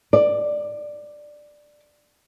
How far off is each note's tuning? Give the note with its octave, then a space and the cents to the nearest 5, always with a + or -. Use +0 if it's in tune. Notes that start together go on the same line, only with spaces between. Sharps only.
D5 +10